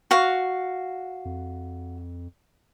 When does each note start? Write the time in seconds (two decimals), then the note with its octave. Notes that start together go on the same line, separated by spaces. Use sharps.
0.11 F#4 F5
1.25 F2